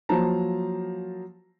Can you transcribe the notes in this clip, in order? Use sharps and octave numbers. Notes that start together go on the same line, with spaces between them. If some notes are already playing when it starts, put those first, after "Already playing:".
F3 F#3 A#3 C5 A5 A#5